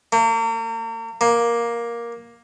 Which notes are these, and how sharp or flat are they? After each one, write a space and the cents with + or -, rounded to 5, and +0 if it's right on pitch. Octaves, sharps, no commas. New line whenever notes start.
A#3 -40
A#3 +10